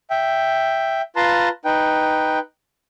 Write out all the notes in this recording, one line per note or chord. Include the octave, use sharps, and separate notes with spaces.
E5 G5
F4 B4 A5 A#5 C6
D#4 B4 G5